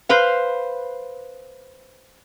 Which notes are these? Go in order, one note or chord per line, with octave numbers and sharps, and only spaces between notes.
B4 C5 F5